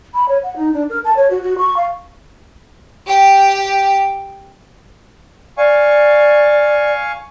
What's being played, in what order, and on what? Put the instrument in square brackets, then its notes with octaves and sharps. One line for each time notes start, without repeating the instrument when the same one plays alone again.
[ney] B5
C#5
F#5
D#4
D4
A#4
A5
C#5
F#4
F#4
C#6
F5
[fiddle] G4 G5
[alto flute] D5 [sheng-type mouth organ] F5 G#5 C#6